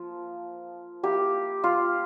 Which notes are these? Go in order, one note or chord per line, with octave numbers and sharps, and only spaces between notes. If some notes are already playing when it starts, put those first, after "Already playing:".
Already playing: F3 A#3
A#3 E4 G4
F4